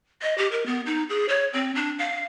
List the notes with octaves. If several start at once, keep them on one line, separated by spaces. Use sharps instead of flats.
D#5
G4
A#4
B3
D#4
G#4
C#5
C4
D4
F5